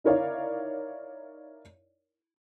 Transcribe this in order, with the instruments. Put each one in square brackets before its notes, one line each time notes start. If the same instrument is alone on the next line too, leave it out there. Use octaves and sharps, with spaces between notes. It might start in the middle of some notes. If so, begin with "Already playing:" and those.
[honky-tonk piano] D#4 E4 A#4 C#5 D5 F5